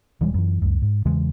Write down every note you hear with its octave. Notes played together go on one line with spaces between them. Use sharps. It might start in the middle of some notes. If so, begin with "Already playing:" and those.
D#1 E3 G3 G#3
F#2 E3
C#2 F#2
G#2
E2 C#3 E3 G#3